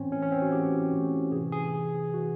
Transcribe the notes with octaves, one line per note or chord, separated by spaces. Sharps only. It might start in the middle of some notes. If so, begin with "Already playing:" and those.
Already playing: A2 E3 C4 C#4
A2 E3 C#4
C#4
C4
F#4
A2 E3 G4
A2 E3
C3 E3 G#4
G#4
C3 E3
C3 E3 F#4